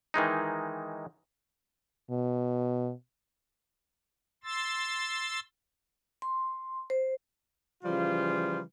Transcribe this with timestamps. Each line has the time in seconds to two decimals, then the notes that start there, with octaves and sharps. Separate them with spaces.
0.14 D#3 E3 G#3 D#4
2.10 B2
4.44 C6 E6 A6
6.22 C6
6.90 C5
7.83 C#3 E3 F3 G3 F4